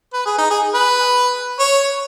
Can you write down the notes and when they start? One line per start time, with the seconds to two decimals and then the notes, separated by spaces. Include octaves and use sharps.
0.13 B4
0.26 G#4
0.38 D#4
0.50 G#4
0.74 B4
1.59 C#5